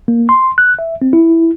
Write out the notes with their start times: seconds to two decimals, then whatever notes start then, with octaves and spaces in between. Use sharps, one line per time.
0.08 A#3
0.29 C6
0.58 F#6
0.79 E5
1.02 C4
1.13 E4